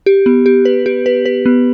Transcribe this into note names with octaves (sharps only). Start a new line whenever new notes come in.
G4
B3
G4
B4
G4
B4
B4
B3